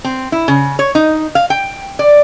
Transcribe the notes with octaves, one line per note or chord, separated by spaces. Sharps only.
C4
E4
C#3
C#5
D#4
F5
G5
D5